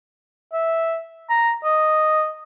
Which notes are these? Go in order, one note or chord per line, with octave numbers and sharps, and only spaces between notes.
E5
A#5
D#5